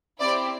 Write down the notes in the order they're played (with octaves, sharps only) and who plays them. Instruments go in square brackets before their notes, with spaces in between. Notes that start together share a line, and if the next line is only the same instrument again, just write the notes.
[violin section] C4 E4 G4 D5